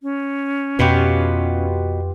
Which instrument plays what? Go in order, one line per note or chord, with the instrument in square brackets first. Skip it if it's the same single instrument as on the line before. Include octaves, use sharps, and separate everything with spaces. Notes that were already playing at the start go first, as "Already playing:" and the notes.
[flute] C#4
[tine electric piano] F2 [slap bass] B2 [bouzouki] B3 F4 G4